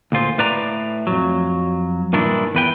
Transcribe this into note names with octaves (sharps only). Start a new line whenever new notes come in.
D2 A#2 F4 C5
A2 B4 D5 A#5
F2 F#3
G2 A#2 D#3 D4 E4
E2 B4 G5